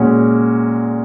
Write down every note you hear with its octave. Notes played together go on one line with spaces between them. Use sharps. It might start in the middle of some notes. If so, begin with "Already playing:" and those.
Already playing: A#2 G#3 C#4 F#4